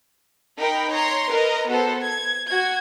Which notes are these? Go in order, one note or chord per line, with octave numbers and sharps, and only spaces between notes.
D#4 A#4 G5 B5
C#5 A#5 C6
A#4 B4 D#5
B3 F#4 A4 C5
G#6
F#4 G#6